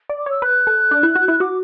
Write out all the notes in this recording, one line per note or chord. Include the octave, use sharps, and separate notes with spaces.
D5
D6
C#5 E6
B4 F#6
A4
D4
E4
F#4
E4
F#4 D6